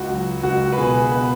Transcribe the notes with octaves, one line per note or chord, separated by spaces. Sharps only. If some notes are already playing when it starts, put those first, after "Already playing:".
Already playing: C#2 F#4
F#3
C#2 F#4
B4
B2 G#4
B3 B4